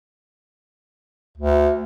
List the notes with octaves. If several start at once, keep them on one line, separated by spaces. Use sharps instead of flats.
D2